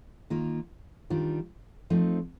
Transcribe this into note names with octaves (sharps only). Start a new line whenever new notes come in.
D#3 A#3 F4
D#3 G3 D4 F4
F3 A3 C4 D#4